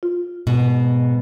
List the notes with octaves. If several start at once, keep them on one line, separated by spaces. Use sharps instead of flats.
F4
G#2 B2